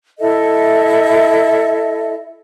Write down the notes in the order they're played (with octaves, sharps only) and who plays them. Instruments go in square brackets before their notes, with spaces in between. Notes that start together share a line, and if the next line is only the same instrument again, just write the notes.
[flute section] E4 A4 D#5 E5